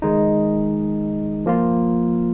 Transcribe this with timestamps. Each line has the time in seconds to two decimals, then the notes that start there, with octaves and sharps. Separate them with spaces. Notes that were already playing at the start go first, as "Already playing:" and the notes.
0.02 D#3 G#3 D#4
1.46 F3 A#3 F4